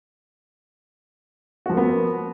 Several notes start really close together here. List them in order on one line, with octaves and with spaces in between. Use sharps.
F#4 F3 A#3 B3